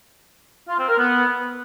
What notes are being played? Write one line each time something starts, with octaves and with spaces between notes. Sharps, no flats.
F4
C4
A#4
B3